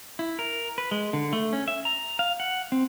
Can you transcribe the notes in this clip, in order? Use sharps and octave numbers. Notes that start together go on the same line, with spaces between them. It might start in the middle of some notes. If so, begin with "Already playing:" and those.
E4
A#4
B4
G#3
D3
A3
C#4
E5
A#5
F5
F#5
C4